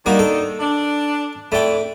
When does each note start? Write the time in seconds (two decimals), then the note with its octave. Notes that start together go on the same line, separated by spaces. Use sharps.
0.06 D#3 G3 A#3 D4 D#4 F#4
0.19 A4
0.60 D4
1.52 F2 A3 E4 D5 G5